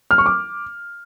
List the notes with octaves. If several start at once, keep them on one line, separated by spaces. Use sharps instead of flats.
F6
C#6
D6